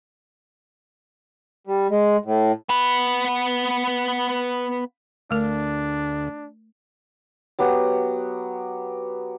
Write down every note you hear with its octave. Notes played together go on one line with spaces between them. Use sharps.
G3
G#3
A2
B3 B4
D2 A3 D4 A#4
F#3 B3 G4 F#5